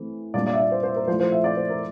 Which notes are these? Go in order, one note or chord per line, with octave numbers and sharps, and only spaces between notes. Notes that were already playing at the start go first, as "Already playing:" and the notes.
Already playing: E3 A3 C4
A#2 G3 A#3 D4 D5
D5
E5
D5
C5
C5
A#4
F3 A3 E4 C5
C5
E5
D5
C5
A#4